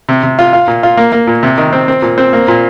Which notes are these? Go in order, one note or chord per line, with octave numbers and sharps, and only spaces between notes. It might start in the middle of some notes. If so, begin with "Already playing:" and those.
C3
C3
F4
F4
A#2
F4
A#3
A#3
A#2
C3
D#3
C4
C4
A#2
C4
A#3
A#2